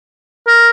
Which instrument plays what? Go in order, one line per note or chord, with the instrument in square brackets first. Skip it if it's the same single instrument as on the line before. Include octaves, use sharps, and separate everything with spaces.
[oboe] A#4